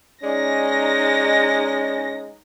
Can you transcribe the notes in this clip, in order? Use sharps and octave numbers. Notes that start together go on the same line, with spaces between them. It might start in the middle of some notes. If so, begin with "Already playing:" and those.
G#3 C#4 D#4 D5 A#6